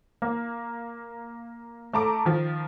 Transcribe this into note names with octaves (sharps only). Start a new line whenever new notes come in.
A#3
A3 A5 A#5 D6
D#3 F3